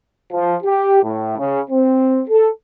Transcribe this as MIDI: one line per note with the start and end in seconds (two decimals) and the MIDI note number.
0.32 0.55 53
0.63 1.00 67
1.02 1.35 45
1.37 1.60 49
1.70 2.21 60
2.28 2.49 69